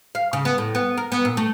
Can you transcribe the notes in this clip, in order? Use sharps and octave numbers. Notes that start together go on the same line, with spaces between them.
F5
C#3
B3
A2
B3
A#4
B3
A#2
A3